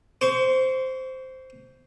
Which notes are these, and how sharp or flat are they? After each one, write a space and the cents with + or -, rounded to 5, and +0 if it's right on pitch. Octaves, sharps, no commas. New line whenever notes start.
C5 -5 C#6 +35